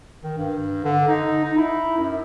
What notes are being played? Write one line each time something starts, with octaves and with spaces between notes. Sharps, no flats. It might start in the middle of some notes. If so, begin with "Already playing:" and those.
D#3
G2
D3
D#4
D#4
E4
F#2